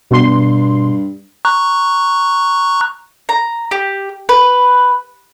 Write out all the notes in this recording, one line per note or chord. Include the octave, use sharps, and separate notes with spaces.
G2 B2 C6
A#5 C#6 F#6
A#5
G4
B4